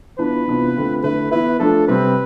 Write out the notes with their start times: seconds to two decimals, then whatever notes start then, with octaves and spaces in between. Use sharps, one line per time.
0.18 E3 B3 D4 F4 B4
0.47 C3 E3 B3 D4 F4
0.76 D3 A3 C4 F4
1.03 D3 A3 E4 B4
1.31 E3 B3 E4 B4
1.60 F3 A3 D4 A4
1.88 C3 G3 C4 B4